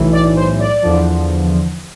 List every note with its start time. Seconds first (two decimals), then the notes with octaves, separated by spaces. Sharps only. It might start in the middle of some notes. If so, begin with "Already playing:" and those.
Already playing: B1 A2 E3
0.12 D5
0.36 C5
0.60 D5
0.82 E2 D3 F3